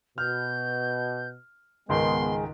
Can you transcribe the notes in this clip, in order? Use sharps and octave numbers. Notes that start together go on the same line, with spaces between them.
B2 F6 G6
C#2 G#2 D#3 G#3 B3 C6